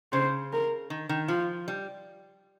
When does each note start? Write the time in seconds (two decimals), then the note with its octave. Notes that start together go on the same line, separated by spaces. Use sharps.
0.13 C#3 C5
0.52 A#4
0.90 D#3
1.09 D#3
1.28 F3 F4
1.68 G3